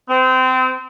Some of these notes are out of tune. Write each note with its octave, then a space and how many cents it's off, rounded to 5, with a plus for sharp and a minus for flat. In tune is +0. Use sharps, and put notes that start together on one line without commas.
C4 -25